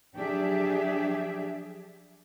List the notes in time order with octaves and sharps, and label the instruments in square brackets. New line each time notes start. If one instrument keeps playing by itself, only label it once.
[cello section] F3 F#3 D4 G4 G#4 E5